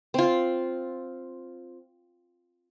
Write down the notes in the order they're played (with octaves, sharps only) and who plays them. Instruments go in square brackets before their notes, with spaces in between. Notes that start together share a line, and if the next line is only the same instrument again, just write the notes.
[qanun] C4 F4